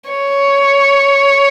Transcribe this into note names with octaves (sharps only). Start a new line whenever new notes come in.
C#5